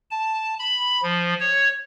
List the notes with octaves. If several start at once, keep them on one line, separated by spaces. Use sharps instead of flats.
A5
B5
F3
C#5